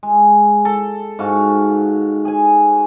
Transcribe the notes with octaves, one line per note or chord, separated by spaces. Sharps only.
G#3
A4
G#2 F#4 F5
G#4 G#5